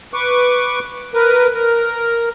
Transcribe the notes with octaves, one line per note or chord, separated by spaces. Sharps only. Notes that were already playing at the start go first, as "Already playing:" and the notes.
B4 C#6 D6
A#4 B4
A#4